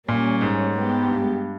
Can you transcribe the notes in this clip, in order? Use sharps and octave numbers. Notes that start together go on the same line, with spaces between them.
A#2 G3 A#3 C#4
G#2
G#3 B3 G4
G2